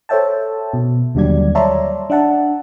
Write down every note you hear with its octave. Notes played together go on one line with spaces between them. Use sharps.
A4 C5 C#5 E5 G5 A5
B2
D#2 D3 F#3 G3 D5 G#6
C#5 D5 E5 A5 A#5 C6
D4 E5 F#5 A5